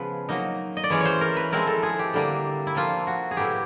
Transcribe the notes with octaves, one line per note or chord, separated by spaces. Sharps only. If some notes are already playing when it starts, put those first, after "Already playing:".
Already playing: C#3 F3 G#3 B3 B4
F#3 A#3 D#4
D#5
D5
E3 G#3 C#4 C#5
C5 C#5
A#4
B4
F3 G#3 C4 E4 A#4
A4
G#4
G4
D3 G3 A#3 D4
E4
C3 F3 A#3 F4
F#4
G#4
A2 F#3 B3 E4 G4